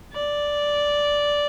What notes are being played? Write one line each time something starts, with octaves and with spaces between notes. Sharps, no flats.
D5